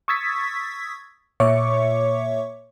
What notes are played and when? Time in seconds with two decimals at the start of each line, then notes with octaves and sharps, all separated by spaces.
0.08 C#6 D#6 E6 G#6 A6 B6
1.40 A#2 C#5 E5 C#6 D6 C#7